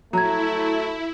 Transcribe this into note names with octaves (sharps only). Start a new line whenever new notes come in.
F#3 A3 E4 A#5 G#6